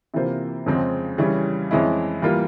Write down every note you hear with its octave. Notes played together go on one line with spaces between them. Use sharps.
C3 E3 A#3 F4 C5
F2 C#3 F3 G#3 C4
C#3 E3 G3 C#4
F2 E3 G#3 C#4 E4
E3 G3 A#3 F4